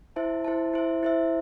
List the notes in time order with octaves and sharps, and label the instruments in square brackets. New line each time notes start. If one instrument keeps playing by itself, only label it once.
[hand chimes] E4 C5 E5 A5
E4 C5 E5 A5
E4 C5 E5
E4 C5 E5